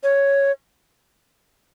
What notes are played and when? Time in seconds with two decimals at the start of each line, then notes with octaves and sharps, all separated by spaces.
0.03 C#5